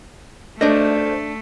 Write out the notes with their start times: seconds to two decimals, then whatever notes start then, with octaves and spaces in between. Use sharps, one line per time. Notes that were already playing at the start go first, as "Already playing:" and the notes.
0.61 A3 D4 A4 C5 D5 D#5